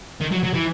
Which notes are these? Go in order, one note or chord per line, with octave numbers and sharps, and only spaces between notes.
D#3
F#3
F#3
E3